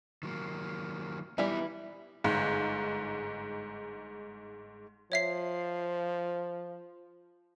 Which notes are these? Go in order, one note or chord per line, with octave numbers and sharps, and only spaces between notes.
D#3 F#3 A#3
E3 G3 B3 D#4 E4
G1 G#2
F3 C#5 E5 C7